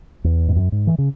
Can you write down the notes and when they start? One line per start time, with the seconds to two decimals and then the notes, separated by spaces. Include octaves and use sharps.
0.24 E2
0.48 G#2
0.56 F#2
0.72 G#2
0.87 E3
0.98 C#3